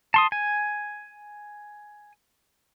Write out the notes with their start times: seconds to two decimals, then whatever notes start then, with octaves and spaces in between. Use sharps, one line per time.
0.14 A5 C6 D#6
0.32 G#5